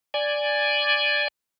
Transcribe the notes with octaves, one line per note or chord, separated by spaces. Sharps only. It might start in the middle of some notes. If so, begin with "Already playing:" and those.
D5 G#5